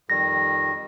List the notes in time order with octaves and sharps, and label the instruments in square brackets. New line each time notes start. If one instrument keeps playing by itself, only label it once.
[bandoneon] F2 D#3 G3 [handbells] A#6